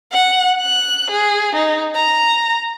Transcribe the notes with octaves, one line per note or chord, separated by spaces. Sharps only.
F#5
F#6
G#4
D#4
A#5